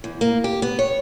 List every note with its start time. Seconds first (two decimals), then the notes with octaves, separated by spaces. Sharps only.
0.04 E2
0.21 A#3
0.44 G4
0.62 B3
0.79 C#5